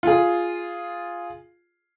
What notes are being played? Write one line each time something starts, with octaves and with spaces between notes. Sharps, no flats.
F4 G#4